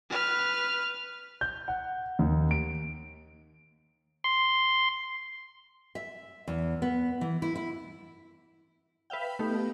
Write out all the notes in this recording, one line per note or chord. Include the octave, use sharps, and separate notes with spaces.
B4 F6
G6
F#5
D#2
D7
C6
E5
E2
B3
E3
E4
E4
B4 E5 F5 G5
A3 B3 D#4 G4